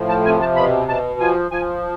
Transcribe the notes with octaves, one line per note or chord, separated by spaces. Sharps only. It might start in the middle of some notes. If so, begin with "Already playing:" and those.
Already playing: A2 F3
A5
C3 G#5
A5
B2 B5
B2 A5
F3 G#5
F3 G#5